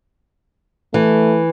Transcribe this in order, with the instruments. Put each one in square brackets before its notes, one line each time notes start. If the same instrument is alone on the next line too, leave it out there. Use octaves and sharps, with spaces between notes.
[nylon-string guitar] E3 [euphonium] A3